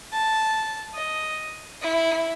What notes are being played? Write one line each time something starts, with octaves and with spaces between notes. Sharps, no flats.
A5
D#5
E4